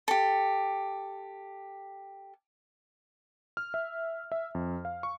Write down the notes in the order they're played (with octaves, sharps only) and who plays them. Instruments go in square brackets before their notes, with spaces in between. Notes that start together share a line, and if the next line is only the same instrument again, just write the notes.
[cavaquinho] G4 A4
[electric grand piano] F6
E5
E5
F2
F5
C#6